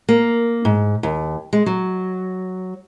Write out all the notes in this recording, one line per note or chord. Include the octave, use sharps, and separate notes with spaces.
A#3
G#2
D#2
G#3
F#3